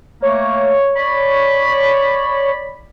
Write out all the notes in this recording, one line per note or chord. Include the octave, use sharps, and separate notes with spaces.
A3 A#3 C#5
D5 B5